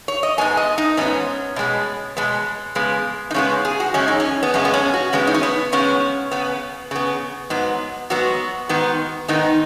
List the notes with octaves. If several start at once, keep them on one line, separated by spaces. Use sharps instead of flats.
C#5
D#5
G#2 G#3 B3 G#5
D#5
D#4
G#2 G#3 B3 C#4
B2 G#3 B3
B2 G#3 B3
C#3 G#3 B3
D#4
C#3 G#3 B3 C#4
G#4
F#4
F#2 C#3 G#3 C#4
D#4
C#4
B3
F#2 C#3 G#3 C#4
B3
C#4
F#4
C#3 G#3 B3 C#4
D#4
C#4
B3
C#3 G#3 B3 C#4
C#3 B3
C#3 B3
G#2 F#3 B3
G#2 F#3 B3 F#4
G#2 D#3 B3
G#2 D#3 B3 D#4